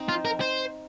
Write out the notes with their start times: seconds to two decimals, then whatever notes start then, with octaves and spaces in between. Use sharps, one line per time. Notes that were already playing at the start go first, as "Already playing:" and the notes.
Already playing: C4 D#4
0.09 F4
0.25 A#4
0.41 C5